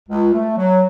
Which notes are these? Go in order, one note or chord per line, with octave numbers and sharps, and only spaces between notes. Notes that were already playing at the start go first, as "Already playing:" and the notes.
C#2
A3
F#3